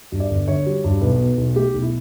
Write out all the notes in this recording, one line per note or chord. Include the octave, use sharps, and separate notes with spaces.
G2
D5
G1
D3 C#5
G3
G2
B1 B4
B2
B1
A3 G4
B1
E4